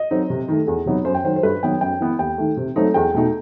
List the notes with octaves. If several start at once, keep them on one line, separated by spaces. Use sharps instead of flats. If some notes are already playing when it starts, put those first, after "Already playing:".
Already playing: D#5
F#3 C4 D#4
C3
D#3 A3
E2
C3 F#3 B3 D#4
F#2 C5
G5
D#3 F#3 C5
C5
G2 B4
D#3 F#3 B3 G5
F#2 G5
E3 B3
D#2 G5
D#3 A3
C3
F#3 A3 C4 D#4
E2 G5
B2 A3 D#4